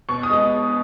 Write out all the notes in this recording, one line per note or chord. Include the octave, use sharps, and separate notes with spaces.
B2 C#6
D#6
G#3 B3